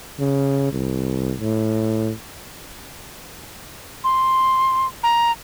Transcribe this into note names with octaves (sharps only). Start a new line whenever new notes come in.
C#3
C2
A2
C6
A#5